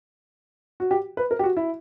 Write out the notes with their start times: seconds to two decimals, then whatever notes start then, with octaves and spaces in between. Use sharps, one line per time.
0.80 F#4
0.91 G4
1.17 B4
1.31 A#4
1.39 G4
1.44 F#4
1.57 E4